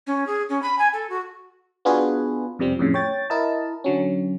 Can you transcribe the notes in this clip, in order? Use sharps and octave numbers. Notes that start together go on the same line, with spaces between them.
C#4
G#4
C#4
B5
G#5
A4
F#4
B3 D4 F4 F#4 G#4 B4
F2 C3 F3 G3 C4
F2 A2 C#3
C#5 G5 A6
E4 A#4 D#5 A5
D3 F#3 C#4